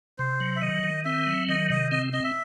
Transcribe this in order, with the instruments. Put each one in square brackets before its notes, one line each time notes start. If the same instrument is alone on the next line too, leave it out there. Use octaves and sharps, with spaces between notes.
[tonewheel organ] C3 [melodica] C5
[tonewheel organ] F#3
[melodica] E5
[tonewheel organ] D#3 [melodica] D#5
[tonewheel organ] D#3
[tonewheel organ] C4 [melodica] E5
[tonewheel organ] F#3
[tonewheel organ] D#3 [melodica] D#5
[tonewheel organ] C3 [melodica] D#5
[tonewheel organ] C4 [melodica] D#5
[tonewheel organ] C4 [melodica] D#5
[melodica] E5